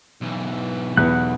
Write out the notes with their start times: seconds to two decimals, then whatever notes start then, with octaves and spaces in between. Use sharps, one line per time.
0.21 B1 E3
0.97 E2 B4 F#5 F#6